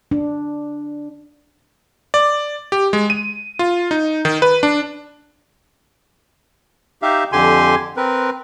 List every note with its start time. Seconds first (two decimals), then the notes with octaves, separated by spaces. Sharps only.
0.11 D4
2.14 D5
2.72 G4
2.93 G#3
3.10 D#7
3.59 F4
3.91 D#4
4.25 D#3
4.42 B4
4.63 D4
7.02 D#4 G4 E5 F5
7.32 F2 D3 G4 G#5 C6
7.97 C4 A#4 B4